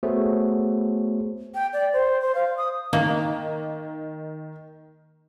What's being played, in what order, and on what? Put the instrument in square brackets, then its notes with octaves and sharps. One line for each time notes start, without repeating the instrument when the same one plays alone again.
[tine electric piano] A3 B3 F#4 G#4 C5 C#5
[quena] G5
D5
C5
C5
F5
D#6
[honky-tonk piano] D#3 [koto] A#3